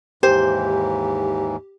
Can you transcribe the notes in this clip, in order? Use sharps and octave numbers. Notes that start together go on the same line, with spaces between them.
D#2 G#2 E3 G4 C5